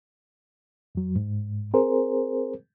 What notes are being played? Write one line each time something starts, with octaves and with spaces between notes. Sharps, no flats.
F2 F#3
G#2
C4 G#4 A#4 C5